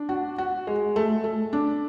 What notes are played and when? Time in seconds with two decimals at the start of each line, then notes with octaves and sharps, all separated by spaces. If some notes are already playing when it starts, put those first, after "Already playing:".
Already playing: D4
0.09 F#4
0.38 F#4
0.67 G#3
0.96 A3
1.24 A3
1.53 D4